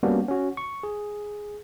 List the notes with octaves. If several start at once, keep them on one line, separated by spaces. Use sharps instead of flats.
G3 A#3 B3 C#4 D4 F#4
C#4 F#4
C#6
G#4